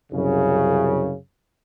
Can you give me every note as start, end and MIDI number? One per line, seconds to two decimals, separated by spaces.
0.13 1.15 36
0.13 1.15 42
0.13 1.15 49